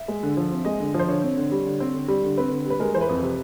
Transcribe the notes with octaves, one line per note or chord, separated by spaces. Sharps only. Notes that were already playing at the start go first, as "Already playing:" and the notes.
Already playing: E5
G#3
D3
F3
C4
G#3 D#5
D3
F3
C5
D3 C#5
C4
D3
G3
D3
C4
D3
G3
D3
C4 B4
D3
G3 B4
G#3 A#4
E3 C5
B4
F2
C3